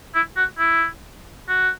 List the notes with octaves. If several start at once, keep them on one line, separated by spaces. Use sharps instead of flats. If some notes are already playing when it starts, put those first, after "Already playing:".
E4
F#4
E4
F#4